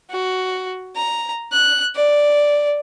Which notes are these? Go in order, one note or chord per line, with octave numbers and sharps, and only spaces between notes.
F#4
A#5
F#6
D5